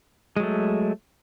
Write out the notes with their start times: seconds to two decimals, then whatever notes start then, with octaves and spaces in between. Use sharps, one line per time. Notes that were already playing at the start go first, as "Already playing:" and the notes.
0.37 G#3
0.40 F#3
0.43 A3